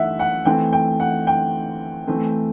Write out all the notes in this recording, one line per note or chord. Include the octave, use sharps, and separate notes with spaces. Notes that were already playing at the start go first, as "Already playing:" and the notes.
Already playing: E3 A3 E5 F#5
F#5
E3 A3 C4 G5
G5
F#5
G5
E3 A3 C4